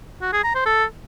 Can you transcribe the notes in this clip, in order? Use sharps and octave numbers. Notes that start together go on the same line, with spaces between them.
F#4
G#4
A#5
C5
A4